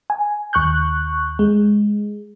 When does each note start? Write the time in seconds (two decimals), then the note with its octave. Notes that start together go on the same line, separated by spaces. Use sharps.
0.10 G#5
0.53 D#2 C#6 F#6 G6
1.39 G#3